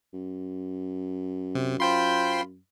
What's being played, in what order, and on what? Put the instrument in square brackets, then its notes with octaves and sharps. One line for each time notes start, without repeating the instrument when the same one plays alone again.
[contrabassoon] F#2
[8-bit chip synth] C3
[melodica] F4 B5 [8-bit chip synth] C5 G5 C6